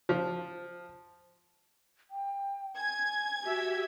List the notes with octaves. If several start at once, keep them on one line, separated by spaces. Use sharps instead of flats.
F3
G5
G#5 G#6
F#4 G4 E5